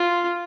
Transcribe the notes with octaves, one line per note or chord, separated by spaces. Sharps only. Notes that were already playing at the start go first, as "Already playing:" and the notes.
Already playing: F4